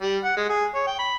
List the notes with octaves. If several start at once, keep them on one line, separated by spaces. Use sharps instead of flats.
G3
F#5
G#3
G#4
C#5
G5
B5